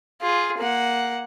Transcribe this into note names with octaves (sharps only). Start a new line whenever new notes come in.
F4 G#4
A#3 F#5